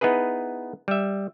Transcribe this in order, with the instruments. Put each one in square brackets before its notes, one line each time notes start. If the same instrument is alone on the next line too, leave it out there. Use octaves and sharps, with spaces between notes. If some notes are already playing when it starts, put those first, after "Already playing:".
[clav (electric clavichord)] B3 D#4 E4 G#4 B4
G3 E5